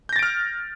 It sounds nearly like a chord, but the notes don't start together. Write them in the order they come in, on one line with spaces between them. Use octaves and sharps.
G6 A#6 A6 D7 F6